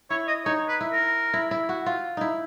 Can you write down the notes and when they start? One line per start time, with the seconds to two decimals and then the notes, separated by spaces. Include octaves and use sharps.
0.10 E4 C#5
0.27 D#5
0.45 D#4 C#5
0.68 B4
0.81 E4
0.92 A#4
1.34 E4
1.51 E4
1.69 F#4
1.86 F4
2.17 D#4 E4